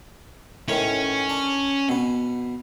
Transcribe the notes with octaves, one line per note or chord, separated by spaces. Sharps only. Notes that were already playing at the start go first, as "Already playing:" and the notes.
A2 D#3 E3 C#4
D4
B2 B3